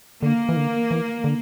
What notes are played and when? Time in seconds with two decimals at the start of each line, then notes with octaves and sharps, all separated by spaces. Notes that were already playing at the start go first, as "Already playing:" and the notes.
0.23 D3 A#3
0.49 E3
0.57 D3
0.91 E3
1.24 D3